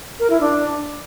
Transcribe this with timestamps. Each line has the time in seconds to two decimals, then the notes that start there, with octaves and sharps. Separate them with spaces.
0.20 A#4
0.30 E4
0.41 D4